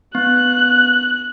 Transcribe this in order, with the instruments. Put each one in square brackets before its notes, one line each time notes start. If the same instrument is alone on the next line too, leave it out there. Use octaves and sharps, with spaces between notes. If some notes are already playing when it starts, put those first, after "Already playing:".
[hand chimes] B3 [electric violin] F#6